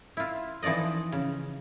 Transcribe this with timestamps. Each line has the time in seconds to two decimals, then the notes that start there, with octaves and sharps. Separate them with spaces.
0.17 E4 F4
0.62 E3 F3 D#4 D5 D#5
1.12 C#3